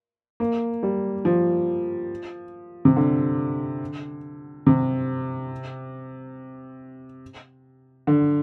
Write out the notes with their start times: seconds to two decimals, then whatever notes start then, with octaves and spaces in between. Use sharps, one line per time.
0.40 A#3
0.83 G3
1.25 F3
2.85 C3
2.96 D3
4.66 C3
8.07 D3